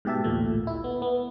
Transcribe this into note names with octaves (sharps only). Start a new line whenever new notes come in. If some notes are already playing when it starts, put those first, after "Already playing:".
G#2 B2 G4 E5 A5
A1 D2 A#2 A3
E4
B3
B3